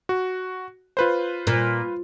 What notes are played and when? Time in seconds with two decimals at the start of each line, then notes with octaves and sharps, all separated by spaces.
0.09 F#4
0.97 F4 B4 C5
1.47 A#2